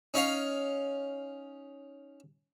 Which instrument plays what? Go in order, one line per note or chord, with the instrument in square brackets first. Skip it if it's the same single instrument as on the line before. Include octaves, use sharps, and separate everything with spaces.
[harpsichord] C#4 D#4 C#5 F5